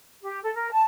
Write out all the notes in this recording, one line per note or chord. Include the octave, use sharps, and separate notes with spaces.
G4
A4
A#4
A5